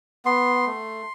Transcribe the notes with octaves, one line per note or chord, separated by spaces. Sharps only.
B3 C6
A3